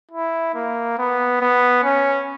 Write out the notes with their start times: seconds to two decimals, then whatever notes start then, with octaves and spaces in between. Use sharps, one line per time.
0.11 E4
0.55 A#3
0.98 B3
1.41 B3
1.84 C#4